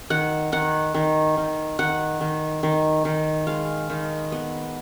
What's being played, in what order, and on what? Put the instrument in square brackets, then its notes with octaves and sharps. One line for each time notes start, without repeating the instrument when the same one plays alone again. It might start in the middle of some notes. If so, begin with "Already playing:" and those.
[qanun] D#3 F#5
D#3 F#5
D#3
D#3
D#3 F#5
D#3
D#3
D#3
G#3 F5
D#3
B3